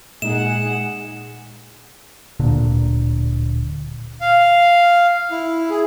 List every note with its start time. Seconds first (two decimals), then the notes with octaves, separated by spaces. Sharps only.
0.22 A#2 G#3 D#4 G#4 F#5 E7
2.39 D1 A#2 D3
4.21 F5
5.31 E4
5.70 G#4